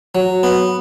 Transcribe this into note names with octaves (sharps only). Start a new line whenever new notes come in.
F#3
B3